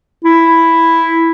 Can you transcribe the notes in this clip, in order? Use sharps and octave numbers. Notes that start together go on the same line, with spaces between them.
E4